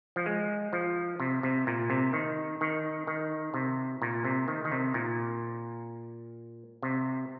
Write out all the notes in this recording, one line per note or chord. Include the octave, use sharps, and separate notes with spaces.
F3
G#3
F3
C3
C3
A#2
C3
D#3
D#3
D#3
C3
A#2
C3
D#3
D#3
C3
A#2
C3